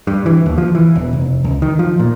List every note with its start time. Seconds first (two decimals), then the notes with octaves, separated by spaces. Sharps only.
0.07 G2
0.26 E3
0.46 D#2
0.58 F3
0.75 E3
0.96 E1
1.13 F1
1.44 C#2
1.62 D#3
1.79 F3
1.99 A#2